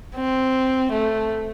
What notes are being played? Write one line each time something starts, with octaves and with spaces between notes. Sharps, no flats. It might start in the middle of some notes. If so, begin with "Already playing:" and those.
C4
A3